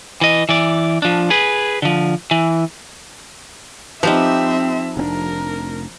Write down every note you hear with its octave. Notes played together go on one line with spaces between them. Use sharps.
E3 D#5
E3 D5
F3 D4
G#4 B4
D3 F3
E3
F3 C4 D#4 G4 B4 E5
F1 C4 D4 A#4